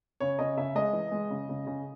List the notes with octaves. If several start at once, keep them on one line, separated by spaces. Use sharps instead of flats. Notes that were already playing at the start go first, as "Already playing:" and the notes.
C#3 C#5
C#3 D#5
C#3 E5
G#3 D#5
E3
G#3
C#3
C#3
C#3